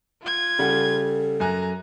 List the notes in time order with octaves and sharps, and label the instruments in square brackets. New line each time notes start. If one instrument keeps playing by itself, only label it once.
[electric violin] F4 G#6
[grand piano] C#3 G3 F#5 [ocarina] A4
[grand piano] F#2 G#5 F#6 [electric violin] A#5